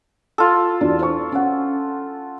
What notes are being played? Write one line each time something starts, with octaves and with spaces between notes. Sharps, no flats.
F4 A4
E2 D4 F#4
C5 C#6
C#4 F#5